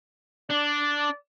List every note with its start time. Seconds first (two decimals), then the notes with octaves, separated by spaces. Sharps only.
0.50 D4 D5